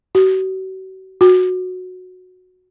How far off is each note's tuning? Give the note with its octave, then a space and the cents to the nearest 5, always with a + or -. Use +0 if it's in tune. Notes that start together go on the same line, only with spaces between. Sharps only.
F#4 +40
F#4 -15